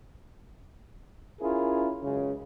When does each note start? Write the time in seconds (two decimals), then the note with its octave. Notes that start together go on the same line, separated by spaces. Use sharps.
1.41 C#4 E4 F4 G#4 A#4
2.03 C#2 F#2 C#3